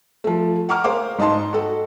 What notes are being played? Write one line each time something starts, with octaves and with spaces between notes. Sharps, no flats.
F3 A3
F#5 A#5 C#6 D6 F6
G#4 A#4 C5 F5 D6
G#2 D#4 D#5 A5 C6
F#4 A4 D#5